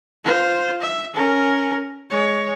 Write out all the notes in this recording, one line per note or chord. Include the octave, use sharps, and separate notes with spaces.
F4 C5
E5
C#4 A#4
G#3 C#5